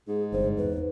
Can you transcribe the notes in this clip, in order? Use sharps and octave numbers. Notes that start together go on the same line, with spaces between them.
G#2 G#4
G1 G2 C3 C5
E2 B4